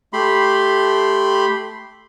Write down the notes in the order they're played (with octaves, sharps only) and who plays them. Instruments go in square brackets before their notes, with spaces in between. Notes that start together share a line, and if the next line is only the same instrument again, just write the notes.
[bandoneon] A3 G4 B5 C6